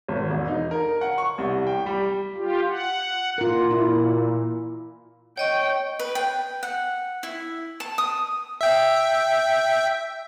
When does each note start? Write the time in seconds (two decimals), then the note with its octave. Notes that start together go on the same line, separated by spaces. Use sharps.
0.08 G#1
0.30 E1
0.48 D#4
0.71 A#4
1.01 F#5
1.18 C#6
1.38 C2
1.67 G5
1.86 G3
2.35 F4 G4
2.69 F#5
3.38 A#2 F4 A#4
3.71 E4
5.38 C#5 D#5 G5 C#6
5.99 B4
6.15 G5
6.63 F#5
7.23 E4
7.80 A5
7.98 D#6
8.61 E5 G5